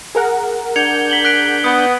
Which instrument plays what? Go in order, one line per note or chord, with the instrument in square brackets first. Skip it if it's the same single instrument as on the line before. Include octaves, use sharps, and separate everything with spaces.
[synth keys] G#4 A#4 F#5
[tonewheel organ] D4 G6 [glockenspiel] G#6 C#7 F7
[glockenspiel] B6 F#7 G7
F#6 B6 D7
[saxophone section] B3 [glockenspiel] D#6